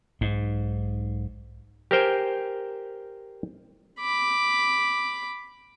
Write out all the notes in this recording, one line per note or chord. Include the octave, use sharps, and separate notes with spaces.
B1 G#2
G4 A#4 C5 G5 G#5
B5 D6